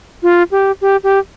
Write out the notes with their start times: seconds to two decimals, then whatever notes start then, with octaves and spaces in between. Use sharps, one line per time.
0.23 F4
0.51 G4
0.81 G4
1.04 G4